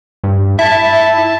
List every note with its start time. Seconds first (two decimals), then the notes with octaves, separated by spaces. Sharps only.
0.24 G2
0.59 E4 E5 A5